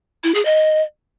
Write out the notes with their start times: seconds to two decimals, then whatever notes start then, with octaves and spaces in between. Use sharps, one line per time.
0.24 E4
0.34 G#4
0.45 D#5